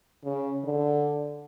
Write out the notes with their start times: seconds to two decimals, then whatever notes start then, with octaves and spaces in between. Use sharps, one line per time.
0.24 C#3
0.64 D3